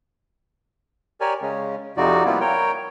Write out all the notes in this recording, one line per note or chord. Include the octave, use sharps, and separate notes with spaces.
G4 A#4 C#5 D5 G#5
C#3 G#3 C#4
F2 C3 F3 D#4 F#4 D5
F3 G3 A#3 B3 E4 F4
A#4 C#5 G5